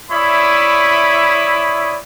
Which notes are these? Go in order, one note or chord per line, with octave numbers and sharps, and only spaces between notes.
E4 C#5 D5 E5 B5 D#6